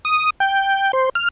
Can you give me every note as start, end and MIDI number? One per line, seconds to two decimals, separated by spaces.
0.05 0.30 87
0.40 0.92 79
0.93 1.09 72
1.15 1.28 89